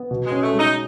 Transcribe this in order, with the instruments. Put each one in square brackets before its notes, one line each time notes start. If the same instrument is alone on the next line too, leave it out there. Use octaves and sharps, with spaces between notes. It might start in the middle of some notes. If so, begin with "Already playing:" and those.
Already playing: [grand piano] B3
B2
[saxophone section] G#3
[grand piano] C#4
[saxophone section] A3
[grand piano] G#3
[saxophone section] D#4